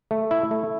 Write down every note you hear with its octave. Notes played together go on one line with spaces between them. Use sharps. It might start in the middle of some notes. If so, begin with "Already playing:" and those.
A3
E4
A3